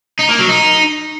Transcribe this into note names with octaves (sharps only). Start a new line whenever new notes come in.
D#4
A#3
F#3
D#4